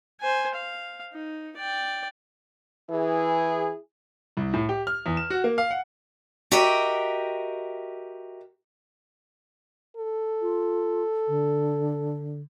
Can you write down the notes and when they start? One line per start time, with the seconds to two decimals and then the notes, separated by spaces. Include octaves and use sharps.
0.21 C5 G#5
0.54 F5
1.13 D#4
1.56 D5 G5
2.90 E3 E4 G#4
4.37 C2
4.54 A2
4.69 G4
4.87 F6
5.06 E2
5.17 E7
5.30 F#4
5.44 A#3
5.58 F5
5.71 F#5
6.52 F#4 G4 A#4 D#5 E5 G5
9.97 A4
10.42 F4
11.28 D3